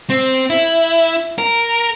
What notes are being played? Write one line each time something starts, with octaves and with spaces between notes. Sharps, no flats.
C4
E4
A#4